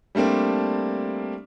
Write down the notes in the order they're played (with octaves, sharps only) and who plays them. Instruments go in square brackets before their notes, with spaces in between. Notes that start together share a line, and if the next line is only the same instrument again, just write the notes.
[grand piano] G3 A3 A#3 C4 D4